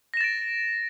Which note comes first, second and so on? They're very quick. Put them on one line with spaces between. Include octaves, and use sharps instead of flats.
A#6 E7 A6 D7